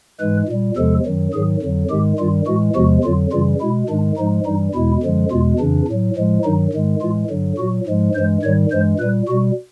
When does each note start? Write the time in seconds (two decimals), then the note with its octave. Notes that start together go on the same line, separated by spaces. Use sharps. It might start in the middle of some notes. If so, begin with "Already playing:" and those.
0.20 G#2 E3 G#3 B4
0.49 A#2 G3
0.77 E2 C3 F3 G#3 A4
1.05 F#2 D#3 F#3
1.34 G#2 D#3 F#3 G#4
1.62 F2 D3 F#3
1.90 G#2 D#3 G#3 G4
2.19 G2 D#3 G3 F4
2.47 A2 E3 G#3 F#4
2.75 E2 C3 F3 G#3 F#4
3.04 F2 D3 F#3 F4
3.32 F#2 C#3 E3 G3 F4
3.61 B2 G#3 E4
3.89 G#2 D#3 G#3 D4
4.17 G#2 F3 G#3 D#4
4.46 G2 E3 G3 D#4
4.75 E2 B2 G#3 E4
5.03 F#2 D3 F3 G#3
5.31 E2 B2 G#3 F4
5.59 F2 C#3 E3 D4
5.88 A2 F#3
6.16 A2 F3 G#3
6.44 G2 D#3 F#3 D#4
6.73 G#2 D#3 G#3
7.01 A2 E3 G#3 F4
7.30 G2 D3 F#3
7.58 A#2 F#3 F#4
7.87 G#2 F3 G#3
8.15 G2 E3 G#3 C5
8.43 G#2 D#3 G3 C#5
8.71 G2 E3 G#3 C5
9.00 A#2 G3 B4
9.28 B2 G3 F#4